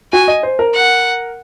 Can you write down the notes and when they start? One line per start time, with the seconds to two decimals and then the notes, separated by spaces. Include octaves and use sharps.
0.13 F#4 G#5
0.28 D#5
0.43 C5
0.59 A#4
0.74 F#5